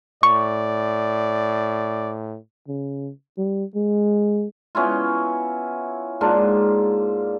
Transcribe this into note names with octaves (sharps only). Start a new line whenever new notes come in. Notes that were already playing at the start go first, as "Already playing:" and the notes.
A2 D5 C#6
C#3
G3
G#3
B3 C#4 E4 F4
G#2 A#3 D4 F4